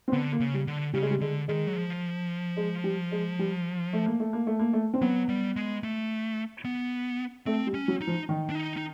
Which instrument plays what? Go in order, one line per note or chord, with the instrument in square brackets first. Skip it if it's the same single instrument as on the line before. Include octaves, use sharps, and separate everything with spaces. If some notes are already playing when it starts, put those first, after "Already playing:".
[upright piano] C4
[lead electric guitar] D3 [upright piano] B3
[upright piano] A#3
[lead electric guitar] C#3
[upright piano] G3
[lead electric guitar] D3
[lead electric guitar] C#3 [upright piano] G3
[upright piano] G#3
G3
[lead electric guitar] D3 [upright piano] G#3
[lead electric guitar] D#3 [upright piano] G#3
[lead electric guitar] F#3
F3
[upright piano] G#3
G3
G#3
G3
A3
A#3
A3
A#3
A3
A#3
A3
C4
[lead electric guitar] F#3 [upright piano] B3
[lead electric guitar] G3
G#3
A3
B3
[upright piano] A3 [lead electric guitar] C4
[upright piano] G3
[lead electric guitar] C#4
[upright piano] F#3
[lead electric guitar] D#4
[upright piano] F3
D#3
[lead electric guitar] D4
D#4
D#4